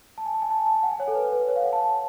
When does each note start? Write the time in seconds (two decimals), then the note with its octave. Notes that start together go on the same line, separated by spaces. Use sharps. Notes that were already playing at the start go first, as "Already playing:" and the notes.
0.18 A5
0.26 G#5
0.34 A5
0.42 G#5
0.51 A5
0.66 A5
0.75 G#5
0.83 F#5
0.91 G#5
1.00 C#5
1.08 A4
1.15 B4
1.32 B4
1.48 C#5
1.56 F5
1.65 F#5
1.73 A5